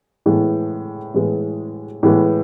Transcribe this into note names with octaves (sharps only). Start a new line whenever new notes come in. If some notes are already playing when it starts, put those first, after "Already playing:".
A2 E3 G#3 B3
A2 E3 G#3 B3
A2 E3 G#3 B3